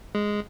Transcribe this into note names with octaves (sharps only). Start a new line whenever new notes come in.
G#3